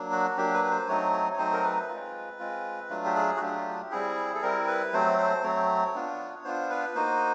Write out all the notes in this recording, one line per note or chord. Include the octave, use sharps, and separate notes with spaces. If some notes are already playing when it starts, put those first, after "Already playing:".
Already playing: F#3 A#3 D4
F#4
F#3 A#3 D4 G4
B4
B4
C5
F#3 A3 C4 D#4 C#5
C#5
C#5
F#3 A3 C4 D#4 C5
A#4
B4
G#3 C4 F4
G#3 C4 F4
F#3 A3 D4 F4
G4
G#4
F#4
F#3 A3 D4 F4 G4
G3 C4 E4 G#4
A4
G3 C4 E4 A#4
B4
F#3 A3 C4 C5
C5
F#3 A3 C4 C#5
B3 D4 F4
B3 D4 F4 C5
B4
A#3 D#4 F#4 C5